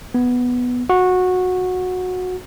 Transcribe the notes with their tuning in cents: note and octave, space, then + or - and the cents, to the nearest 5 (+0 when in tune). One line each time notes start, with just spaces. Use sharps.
B3 +0
F#4 -15